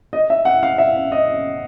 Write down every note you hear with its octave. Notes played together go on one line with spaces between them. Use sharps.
D#5
E5
F#5
F5
E5
D#5